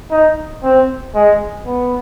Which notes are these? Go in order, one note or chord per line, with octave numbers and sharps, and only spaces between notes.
D#4
C4
G#3
B3